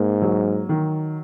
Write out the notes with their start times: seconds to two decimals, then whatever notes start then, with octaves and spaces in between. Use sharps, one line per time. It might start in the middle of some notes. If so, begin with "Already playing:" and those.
Already playing: G#2 A#3
0.22 F#3
0.69 D#3